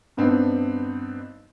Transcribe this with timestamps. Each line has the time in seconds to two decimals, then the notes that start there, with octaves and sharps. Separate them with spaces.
0.17 G2 B3 C4 D4 D#4